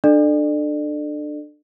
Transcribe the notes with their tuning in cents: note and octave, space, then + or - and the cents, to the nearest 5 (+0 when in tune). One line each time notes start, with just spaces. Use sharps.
D4 +25 A4 +0 D5 +35